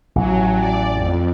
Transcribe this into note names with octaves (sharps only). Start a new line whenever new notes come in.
A1 F#3
D5
F2